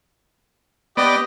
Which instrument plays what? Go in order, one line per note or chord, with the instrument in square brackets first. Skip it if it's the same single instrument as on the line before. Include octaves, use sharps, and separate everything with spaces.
[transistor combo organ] B3 D5 [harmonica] G4 D#5